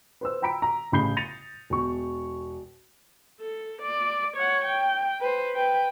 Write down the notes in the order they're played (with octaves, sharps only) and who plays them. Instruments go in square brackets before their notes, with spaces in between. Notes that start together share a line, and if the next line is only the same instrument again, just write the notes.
[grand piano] B4 C5 E6
G5 A#5 B5 B6 D7
A#5
A1 C#3 B5 G6 C7 G7
A6 A#6 C#7 D#7 F7
E1 C#6
[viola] A4
D5
C#5 F#5
G5
B4 C5
B4 G5